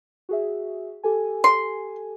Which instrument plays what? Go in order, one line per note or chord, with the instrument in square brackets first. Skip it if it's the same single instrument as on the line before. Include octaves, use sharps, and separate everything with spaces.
[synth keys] F#4 G#4 E5
G4 A4 G#5
[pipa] C6